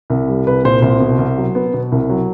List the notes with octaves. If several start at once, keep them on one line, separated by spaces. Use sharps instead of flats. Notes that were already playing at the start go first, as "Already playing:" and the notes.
C2
G3
C2 B4
A#2 C5
C2 C5
B2
C2
F#3
B3
B2
C2
F#3